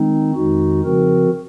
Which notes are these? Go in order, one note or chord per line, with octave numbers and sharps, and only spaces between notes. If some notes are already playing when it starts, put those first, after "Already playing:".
Already playing: D#3 G#3 C4 D#4
F2 D#3 G#3 D#4 F#4
C#3 F3 C4 F#4 A#4